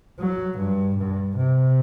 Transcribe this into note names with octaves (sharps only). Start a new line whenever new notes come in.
F#3
G2
G2
C3